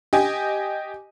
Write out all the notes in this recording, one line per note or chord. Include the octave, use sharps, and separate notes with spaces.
G4 D#5 G#5